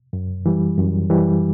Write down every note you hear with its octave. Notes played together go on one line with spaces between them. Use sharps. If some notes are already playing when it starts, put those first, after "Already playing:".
F#2
E3 G3
F#2
E3 G3